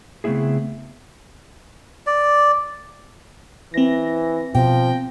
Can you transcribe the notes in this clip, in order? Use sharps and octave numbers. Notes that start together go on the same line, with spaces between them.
C#3 A3 B3 C4 E4 G#4
D5
E3 C4 A#6
B2 F3 G5